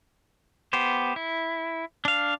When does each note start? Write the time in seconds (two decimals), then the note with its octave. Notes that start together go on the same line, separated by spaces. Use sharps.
0.73 B3 G4 C5
1.16 E4
2.05 D4 F5